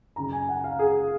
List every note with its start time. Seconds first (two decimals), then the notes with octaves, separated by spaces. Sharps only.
0.16 F#2 C#3 A#5
0.32 G#5
0.48 F#5
0.64 F5
0.79 G#4